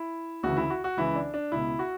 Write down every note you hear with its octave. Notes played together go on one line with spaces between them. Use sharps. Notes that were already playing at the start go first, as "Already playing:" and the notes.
Already playing: E4
D2 C#3 E3 F#4
E4
F#4
F#4
C#2 C#3 E3 E4
D4
D4
C#2 B2 E4
F#4